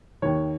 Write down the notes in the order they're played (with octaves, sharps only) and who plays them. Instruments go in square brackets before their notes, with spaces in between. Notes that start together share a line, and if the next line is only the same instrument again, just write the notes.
[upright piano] D#2 D#3 C#5